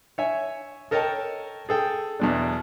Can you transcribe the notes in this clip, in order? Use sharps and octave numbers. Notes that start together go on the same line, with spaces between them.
C#5 E5 G#5
A4 A#4 C#5 D#5 G5 A5
G#4 A4 G5
E2 B2 D4